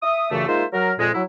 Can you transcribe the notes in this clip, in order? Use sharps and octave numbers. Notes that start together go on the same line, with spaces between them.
E5 D#6
F#2 A#2 C#3 E3 A3
G#3 A#3 D#4 F4 C5 E5
F#3 A#4
F2 A#2 G#3
F#3 E4